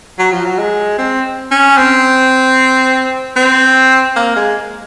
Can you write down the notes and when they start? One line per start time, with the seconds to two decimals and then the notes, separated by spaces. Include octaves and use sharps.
0.19 F#3
0.32 F3
0.45 F#3
0.59 G#3
0.98 C4
1.52 C#4
1.78 C4
3.36 C4
4.16 A#3
4.36 G#3